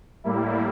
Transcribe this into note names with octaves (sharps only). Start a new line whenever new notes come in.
A2 G3 A#3 E4